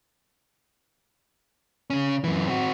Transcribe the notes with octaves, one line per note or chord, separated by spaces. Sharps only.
C#3 C#4
F#2 E3
C4 F#4